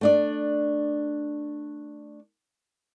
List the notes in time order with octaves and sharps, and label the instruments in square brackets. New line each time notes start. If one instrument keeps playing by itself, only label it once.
[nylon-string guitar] A3 D4 D5